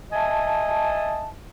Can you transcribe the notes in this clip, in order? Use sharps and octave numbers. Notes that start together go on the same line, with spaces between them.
D#5 E5 G#5 A5